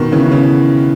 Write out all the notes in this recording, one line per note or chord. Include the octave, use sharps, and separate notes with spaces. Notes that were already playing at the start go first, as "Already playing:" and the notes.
Already playing: B2 D#3
C#3 E3
C#3 E3